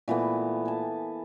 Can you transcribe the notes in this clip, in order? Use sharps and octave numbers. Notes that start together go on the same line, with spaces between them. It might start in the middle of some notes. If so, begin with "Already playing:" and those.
A#2 E3 A3 B3
G#5 A5